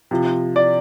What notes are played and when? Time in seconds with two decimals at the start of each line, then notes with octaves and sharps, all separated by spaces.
0.11 C3 F3
0.56 D5